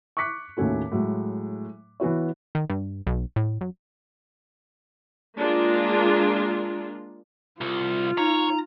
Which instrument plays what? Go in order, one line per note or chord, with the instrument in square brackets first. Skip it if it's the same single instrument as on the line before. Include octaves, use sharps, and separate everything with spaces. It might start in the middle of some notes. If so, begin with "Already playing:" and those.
[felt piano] C#6 D6 F#6 B6 C#7
D#2 A2 D#3 C#4 F#4 A4
A2 F#3 G#3
E3 B3 F#4 C#5
[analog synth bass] D#3
G2
B1
A2
F#2
[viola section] G#3 A#3 D4 F4
[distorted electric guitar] C2 [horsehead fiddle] F4
[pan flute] D#4 [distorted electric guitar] C#5 [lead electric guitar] A#5